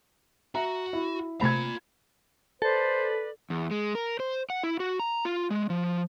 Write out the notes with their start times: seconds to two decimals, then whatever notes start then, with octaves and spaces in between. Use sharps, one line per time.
0.55 F#4 E5 A#5
0.93 E4
1.41 C3 A3 C4 F4 A#5 B5 G#6
2.62 A4 B4 C5 D5
3.50 E2
3.71 G#3
3.95 A#4
4.20 C5
4.50 F#5
4.63 E4
4.80 F#4
4.99 A#5
5.25 F4
5.50 G#3
5.70 F3